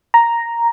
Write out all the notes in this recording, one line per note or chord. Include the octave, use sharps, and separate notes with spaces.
A#5